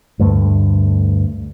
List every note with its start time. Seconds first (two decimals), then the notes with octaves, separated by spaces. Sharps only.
0.19 D2 G2 A3